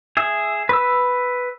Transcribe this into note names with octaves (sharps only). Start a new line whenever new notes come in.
G#4 E5
B4 E6